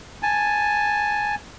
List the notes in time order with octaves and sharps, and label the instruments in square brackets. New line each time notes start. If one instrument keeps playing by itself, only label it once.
[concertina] G#5 A5